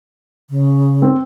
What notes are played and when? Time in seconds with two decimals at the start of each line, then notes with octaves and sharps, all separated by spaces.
0.50 C#3
1.02 C4